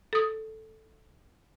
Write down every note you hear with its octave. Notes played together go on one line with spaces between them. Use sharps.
A4 D#6